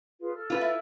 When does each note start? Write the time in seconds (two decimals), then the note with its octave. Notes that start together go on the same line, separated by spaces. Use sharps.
0.20 F4 G#4 B4
0.34 A4 F6
0.50 F4 B4
0.61 E4